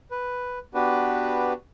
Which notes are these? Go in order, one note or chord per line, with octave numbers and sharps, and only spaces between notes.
B4
B3 D4 F#4 G4 B4